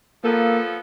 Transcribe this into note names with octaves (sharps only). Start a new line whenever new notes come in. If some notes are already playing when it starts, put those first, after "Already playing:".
F3 A#3 B3 A4